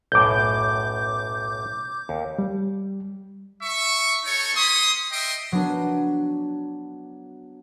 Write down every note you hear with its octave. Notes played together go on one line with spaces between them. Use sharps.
B1 F#2 A2 D6 G6
D#2
G3
E5 C#6
D#4 A4 C#5 C#6
A#3 B5 C6 D#6
D#5 E5 G5 C6 D#6
F#3 B3 D4